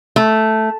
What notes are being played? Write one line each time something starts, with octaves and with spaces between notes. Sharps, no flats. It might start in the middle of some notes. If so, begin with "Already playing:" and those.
A3